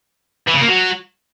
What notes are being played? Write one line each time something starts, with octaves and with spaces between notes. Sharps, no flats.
E3
C#3
A#3
F#3